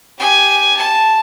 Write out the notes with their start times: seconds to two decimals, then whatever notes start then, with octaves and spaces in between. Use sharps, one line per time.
0.19 G4 G#5
0.77 A5